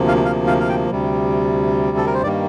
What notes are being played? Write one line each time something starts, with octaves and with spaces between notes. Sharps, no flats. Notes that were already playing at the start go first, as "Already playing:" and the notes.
Already playing: D2 C3 F3 A#3
F5
F5
F5
F5
G5
D2 C3 G3
A4
A#4
C5
G2 D#3 G3 A#3 D5